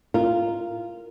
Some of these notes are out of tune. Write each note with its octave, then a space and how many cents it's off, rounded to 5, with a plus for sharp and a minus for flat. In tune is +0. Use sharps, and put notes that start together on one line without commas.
F4 -15 A#4 -5